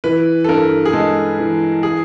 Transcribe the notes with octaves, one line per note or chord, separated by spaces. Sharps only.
E3 B4
A4
G2 A#4
G#4
G#3 A4
E3
G#4